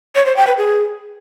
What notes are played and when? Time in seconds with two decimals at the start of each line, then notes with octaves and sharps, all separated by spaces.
0.15 C#5
0.26 C5
0.36 G5
0.47 B4
0.57 G#4